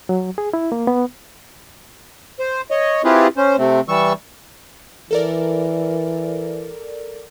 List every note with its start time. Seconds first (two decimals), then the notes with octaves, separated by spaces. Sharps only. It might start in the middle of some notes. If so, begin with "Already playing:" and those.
0.09 F#3
0.38 G#4
0.54 E4
0.72 A#3
0.87 B3
2.39 C5
2.71 C#5 D#5
3.04 C4 E4 F4 G4 G#4 B4
3.37 C#4 C5
3.58 C3 A3 C4
3.88 E3 G3 C#6 E6
5.11 E3 A4 A#4 D5